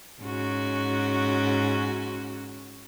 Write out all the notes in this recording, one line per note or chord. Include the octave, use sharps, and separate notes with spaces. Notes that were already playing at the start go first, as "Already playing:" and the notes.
G#2 C#4 F#4